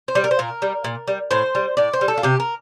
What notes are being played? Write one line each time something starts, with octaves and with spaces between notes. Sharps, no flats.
C5
G3
A#4
C5
A#2 A#4
G3
A#2
G3
A2 C5
G3
A2 D5
C5
G3
A4
F4
C3 G4
A#4